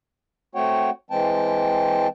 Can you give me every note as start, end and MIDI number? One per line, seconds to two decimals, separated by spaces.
0.55 0.90 57
0.55 0.90 60
0.55 0.90 66
0.55 0.90 73
0.55 0.90 78
0.55 0.90 79
1.11 2.08 52
1.11 2.08 56
1.11 2.08 60
1.11 2.08 79
1.11 2.08 81